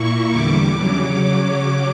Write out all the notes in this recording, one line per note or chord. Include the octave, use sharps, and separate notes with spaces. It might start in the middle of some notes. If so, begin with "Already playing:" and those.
Already playing: A#2 A#3 E4 C#6
E2 D3 G3 D6
C#3 F#3 C#4 D6